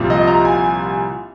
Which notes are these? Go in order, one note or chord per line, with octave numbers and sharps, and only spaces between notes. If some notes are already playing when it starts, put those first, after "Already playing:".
Already playing: C2 A#2 F3
D#5
A#5
G#5